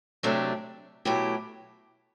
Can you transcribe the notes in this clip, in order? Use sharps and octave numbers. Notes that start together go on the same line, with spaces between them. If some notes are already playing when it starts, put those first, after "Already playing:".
C3 F#3 A3 D4 G4
B2 F#3 A3 E4 G4